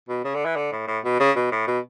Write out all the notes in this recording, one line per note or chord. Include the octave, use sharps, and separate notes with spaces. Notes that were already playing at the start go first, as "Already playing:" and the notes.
B2
C#3
D3
E3
D3
A2
A2
B2
C#3
B2
A2
B2